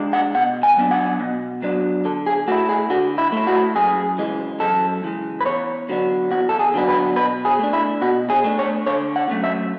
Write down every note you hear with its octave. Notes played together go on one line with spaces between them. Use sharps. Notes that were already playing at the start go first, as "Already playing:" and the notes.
Already playing: G#3 D4
F#5
B2 F#5
G#5
F#3 B3 D4
F#5
B2
F#3 B3 D4
D3 A4
G#4
A3 E4 F#4
G#4
D3 F#4
E4
A3 E4
F#4
F#2 G#4
C#3 E3 G#3
F#2 A4
C#3 E3 G#3
B4
E2 C#5
D3 F#3 B3 D4
E2 F#4
A4
G#4
D3 F#3 B3 D4
B4
B2 B4
G#4
A3 D4
E4
B2 F#4
G#4
A3 D4
C#5
D3 C#5
F#5
F#3 A3 C#4
E5